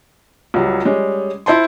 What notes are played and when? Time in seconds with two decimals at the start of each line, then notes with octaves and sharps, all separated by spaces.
0.54 C#2 F#3 G3
0.85 G3 G#3 C#4
1.46 E4 C5 A5 C6